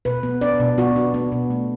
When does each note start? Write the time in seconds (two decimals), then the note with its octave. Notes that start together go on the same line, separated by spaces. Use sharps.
0.05 B2 B4
0.23 B3
0.41 D4 D5
0.60 B2
0.78 B3 F#4
0.96 D4
1.14 B3
1.32 B2
1.50 A3